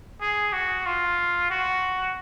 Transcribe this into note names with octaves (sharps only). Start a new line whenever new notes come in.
G#4
F#4
F4
F#4